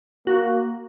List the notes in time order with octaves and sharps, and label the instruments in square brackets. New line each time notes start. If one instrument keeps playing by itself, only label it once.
[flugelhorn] A#3 [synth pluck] F#4